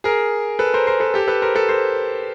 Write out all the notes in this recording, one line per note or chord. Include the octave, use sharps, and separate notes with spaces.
G#4 A#4
A4 B4
A#4 C5
A#4 C5
A4 B4
G4 A4
A4 B4
A#4 C5
A4 B4
A#4 C5